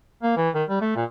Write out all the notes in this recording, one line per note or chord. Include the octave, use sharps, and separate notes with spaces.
A#3
E3
D#3
G3
A3
A#2